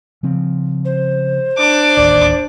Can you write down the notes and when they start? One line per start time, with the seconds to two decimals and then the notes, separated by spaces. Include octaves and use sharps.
0.23 C#3 F3 C4
0.85 C5
1.58 D4 D6
1.97 D1 A1 D#2 D5